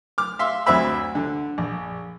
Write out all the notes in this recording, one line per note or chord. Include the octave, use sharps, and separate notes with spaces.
D6 F6
E5 F5 C6
D2 F#3 C4 E5 B5 E6
D3
A#1